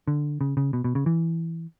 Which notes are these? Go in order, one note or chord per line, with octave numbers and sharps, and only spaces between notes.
D3
C#3
C#3
B2
B2
C#3
E3